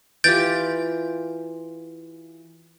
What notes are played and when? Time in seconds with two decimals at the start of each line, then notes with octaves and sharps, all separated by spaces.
0.24 E3 F4 G4 G6 A6 D7